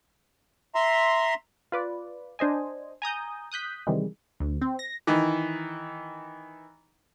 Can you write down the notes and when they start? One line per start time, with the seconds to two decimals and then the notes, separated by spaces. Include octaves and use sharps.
0.75 E5 A#5 C6
1.72 F4 B4 D5
2.39 D4 C5 D#5 G#5
3.02 G#5 A#5 D#6 G6
3.52 D#6 F#6 G6 B6
3.87 C3 D#3 E3 G3 G#3
4.40 D2
4.61 C4
4.79 A#6
5.07 D#3 E3